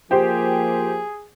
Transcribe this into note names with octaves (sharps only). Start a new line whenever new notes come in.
F3 A#3 G4 G#4 C5